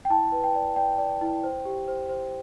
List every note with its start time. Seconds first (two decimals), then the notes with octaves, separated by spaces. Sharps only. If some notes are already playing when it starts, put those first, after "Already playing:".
0.05 G5
0.10 E4 A5
0.32 B4
0.44 G5
0.55 D5
0.76 D5 G5
0.98 D5
1.21 E4
1.44 C5
1.65 G4
1.88 C5
2.09 C5